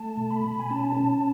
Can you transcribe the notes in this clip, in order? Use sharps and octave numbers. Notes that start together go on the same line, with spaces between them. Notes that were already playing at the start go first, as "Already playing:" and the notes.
Already playing: A3 A5
B2
B5
B2
G#5
C#4 A5
C#4